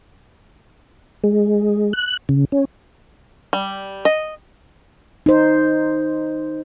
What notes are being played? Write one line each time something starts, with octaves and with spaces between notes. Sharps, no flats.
G#3
F#6
C#3
C#4
G3
D#5
D#4 C5